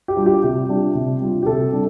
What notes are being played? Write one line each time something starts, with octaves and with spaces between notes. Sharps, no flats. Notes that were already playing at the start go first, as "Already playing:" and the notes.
G4
G3 D4 F4
G4
C3 G4
G3 D4 F4
C3
G3 D4 F4
G4
C3 A4
G3 D4